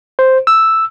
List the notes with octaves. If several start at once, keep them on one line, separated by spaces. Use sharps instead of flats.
C5
E6